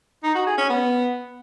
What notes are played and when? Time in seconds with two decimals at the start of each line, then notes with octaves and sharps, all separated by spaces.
0.23 D#4
0.35 F#4
0.46 G#4
0.58 C#4
0.70 B3